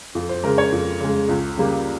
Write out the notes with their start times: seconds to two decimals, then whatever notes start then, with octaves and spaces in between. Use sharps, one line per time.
0.15 F2
0.29 C5
0.43 C#3 G#3 A#4
0.58 C#5
0.72 F2
1.01 C#3 G#3
1.29 C#2
1.57 C#3 G3 A#3